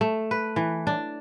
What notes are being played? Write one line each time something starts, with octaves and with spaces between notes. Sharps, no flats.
A3
B4
E3
D4